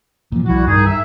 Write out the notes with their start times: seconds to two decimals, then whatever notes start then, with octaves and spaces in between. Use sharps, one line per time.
0.32 A#2 F3
0.46 B1 F3 G3 E4 F#4
0.67 G2 D#3 D#4 G#4
0.86 E5